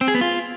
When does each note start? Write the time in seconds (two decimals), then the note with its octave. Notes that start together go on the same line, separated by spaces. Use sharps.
0.01 C4
0.08 G#4
0.15 B3
0.21 F4